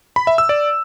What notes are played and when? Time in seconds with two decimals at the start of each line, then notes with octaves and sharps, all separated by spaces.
0.16 B5
0.27 E5
0.38 E6
0.49 D5